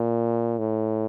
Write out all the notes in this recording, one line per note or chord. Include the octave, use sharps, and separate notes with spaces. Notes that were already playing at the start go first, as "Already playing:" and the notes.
Already playing: A#2
A2